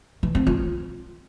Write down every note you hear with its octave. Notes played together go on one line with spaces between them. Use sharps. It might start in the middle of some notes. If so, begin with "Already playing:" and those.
E3
C4
F4